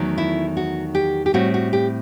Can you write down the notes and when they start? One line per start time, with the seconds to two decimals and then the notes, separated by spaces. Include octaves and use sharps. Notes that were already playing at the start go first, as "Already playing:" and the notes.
Already playing: E2 D#3 F#3 A3
0.18 E4
0.57 F#4
0.95 G4
1.26 G4
1.34 A2 G3 C4 F#4
1.54 F#4
1.73 G4